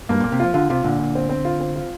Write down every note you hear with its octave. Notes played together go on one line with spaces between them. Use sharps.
G2 A#3
A#2 A#3
C3
F3 F4
D3 F4
C3 F4
A#2 D3
A#2
C4
C4
F4
C4
F4